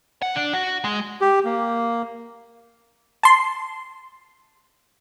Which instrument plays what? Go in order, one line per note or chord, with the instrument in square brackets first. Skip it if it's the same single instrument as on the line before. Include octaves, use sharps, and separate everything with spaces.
[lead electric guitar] F#5
D4
F#4
G#3
[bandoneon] G4
A#3
[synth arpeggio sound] A5 C6